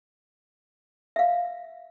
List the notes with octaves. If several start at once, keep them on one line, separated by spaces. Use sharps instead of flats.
E5 F5